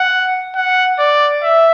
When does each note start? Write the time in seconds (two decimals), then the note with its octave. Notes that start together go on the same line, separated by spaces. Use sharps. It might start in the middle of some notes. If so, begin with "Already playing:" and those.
Already playing: F#5
0.55 F#5
0.99 D5
1.43 E5